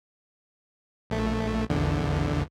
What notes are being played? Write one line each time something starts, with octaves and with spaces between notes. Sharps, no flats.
A#1 A3
A#1 E2 D3